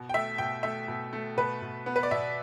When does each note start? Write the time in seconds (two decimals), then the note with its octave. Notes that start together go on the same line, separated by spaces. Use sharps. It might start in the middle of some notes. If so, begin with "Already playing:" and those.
Already playing: B2
0.09 G5
0.14 A3 E5
0.38 B2 G5
0.63 A3 E5
0.88 B2
1.13 A3
1.37 B2 B4
1.62 B2
1.86 B3
1.96 B4
2.03 D5
2.11 B2 E5